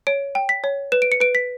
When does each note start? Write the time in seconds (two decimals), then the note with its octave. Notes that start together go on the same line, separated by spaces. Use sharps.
0.07 C#5 D7
0.35 G5
0.49 B6
0.64 C#5
0.92 B4 E7
1.02 D7
1.12 C#7
1.20 B4 D7
1.35 B6